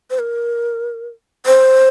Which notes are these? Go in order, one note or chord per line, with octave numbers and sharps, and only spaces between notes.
C5
A#4
C5